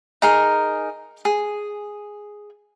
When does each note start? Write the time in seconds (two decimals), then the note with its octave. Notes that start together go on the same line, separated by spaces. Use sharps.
0.22 D#4 G#4 A#4
1.25 G#4